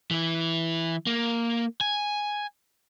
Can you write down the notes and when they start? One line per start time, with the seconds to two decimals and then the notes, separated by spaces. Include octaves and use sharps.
0.11 E3 E4
1.07 A#3
1.81 G#5